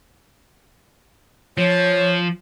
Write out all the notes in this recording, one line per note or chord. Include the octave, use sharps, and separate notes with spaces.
F3 C#5